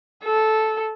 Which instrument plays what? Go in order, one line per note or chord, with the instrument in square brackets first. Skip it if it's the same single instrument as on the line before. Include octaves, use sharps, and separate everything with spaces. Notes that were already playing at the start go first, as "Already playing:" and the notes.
[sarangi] A4